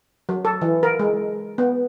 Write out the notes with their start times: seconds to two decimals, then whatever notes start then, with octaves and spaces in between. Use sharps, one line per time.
0.29 F#3
0.45 A4
0.62 E3
0.83 A#4
0.99 G#3
1.58 B3